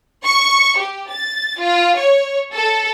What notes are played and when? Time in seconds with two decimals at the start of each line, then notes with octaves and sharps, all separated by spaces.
0.25 C#6
0.78 G4
1.11 A6
1.61 F4
1.97 C#5
2.53 A4